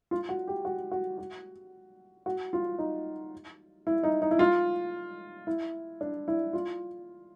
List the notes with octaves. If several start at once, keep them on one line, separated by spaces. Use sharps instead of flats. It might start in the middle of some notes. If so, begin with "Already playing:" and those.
F4
F#4
G4
F#4
F#4
F#4
F#4
F4
D#4
E4
D#4
D#4
E4
F4
E4
D4
E4
F4